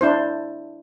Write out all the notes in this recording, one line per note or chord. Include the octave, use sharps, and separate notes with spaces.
D4 E4 C5